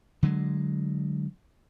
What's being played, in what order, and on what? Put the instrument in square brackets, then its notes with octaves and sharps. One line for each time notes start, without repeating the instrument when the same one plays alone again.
[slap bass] D3 F#3 G#3